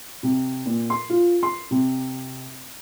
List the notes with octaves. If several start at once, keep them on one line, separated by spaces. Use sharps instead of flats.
C3
A#2
C6
F4
C6
C3